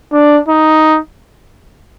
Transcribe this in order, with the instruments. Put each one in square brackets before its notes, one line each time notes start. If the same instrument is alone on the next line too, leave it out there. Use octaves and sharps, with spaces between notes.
[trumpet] D4
D#4